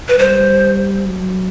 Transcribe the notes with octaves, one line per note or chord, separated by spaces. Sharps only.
B4
G3 C5
F#3